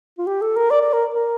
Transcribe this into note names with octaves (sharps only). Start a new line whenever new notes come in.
F4
G4
A4
A#4
D5
D5
A#4
A#4